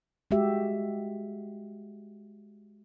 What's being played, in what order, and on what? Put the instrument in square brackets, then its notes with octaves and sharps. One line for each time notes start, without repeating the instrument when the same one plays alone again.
[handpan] G#3 F#4 G4 E5